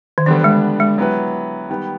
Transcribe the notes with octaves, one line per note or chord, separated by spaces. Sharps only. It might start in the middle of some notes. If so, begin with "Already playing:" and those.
D#3
D3 E3 G3 B3 D4
G#3
G#3
F#3 B3 E4 G4 B4
D#3 G3 B3